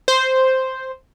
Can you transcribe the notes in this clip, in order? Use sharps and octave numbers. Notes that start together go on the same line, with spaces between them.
C5